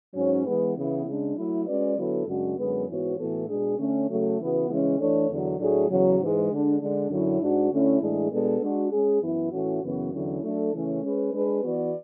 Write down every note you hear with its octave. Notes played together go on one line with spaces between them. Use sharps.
G#2 F#3 C#4
E3 G#3 B3
C#3 E3 B3 E4
C#3 G#3 D4
F#3 A3 E4
G#3 C#4 F#4 B4 D5
D3 F#3 B3 E4 A4
F#2 C#3 G#3 D4 F#4
F#2 D3 G#3 B3
G#2 E3 B3 F#4 C#5
A2 E3 B3 F#4 A4
B2 G#3 D4 G#4
D3 A3 C#4
C#3 F#3 A3
C#3 E3 B3 F#4
C#3 E3 G#3 C#4
E3 A3 D4 A4 C#5
E2 D3 F#3
A2 F#3 A3 D4 G#4
E2 C#3 F#3
G#2 E3 G#3
D3 G#3 D4
D3 G#3 D4
F#2 D3 F#3 C#4 E4
G#2 G#3 D4 F#4
D3 A3 C#4 E4
A2 E3 G#3 D4 G#4
B2 G#3 B3 D4 A4
G#3 D4 F#4
G#3 C#4 G#4
F#2 E3 B3 E4
A2 E3 A3 C#4 F#4
F#2 C#3 E3 B3 F#4
E2 D3 F#3 C#4 E4
F#3 A3 D4 A4
C#3 E3 A3 C#4
G#3 C#4 G#4 B4
G#3 D4 G#4 B4
E3 B3 F#4 B4 D5